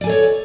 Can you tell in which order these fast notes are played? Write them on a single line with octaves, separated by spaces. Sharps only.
D5 G#5 A4 C#5